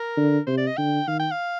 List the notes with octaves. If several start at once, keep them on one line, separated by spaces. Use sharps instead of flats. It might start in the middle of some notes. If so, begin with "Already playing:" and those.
Already playing: A#4
D3
C3 C5
D5
D#5
D3 G5
D#3 F5
G5
F5